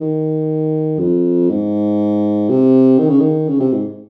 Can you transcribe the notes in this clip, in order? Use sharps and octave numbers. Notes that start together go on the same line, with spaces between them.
D#3
F2
G#2
C3
D#3
C#3
D#3
C#3
C3
G#2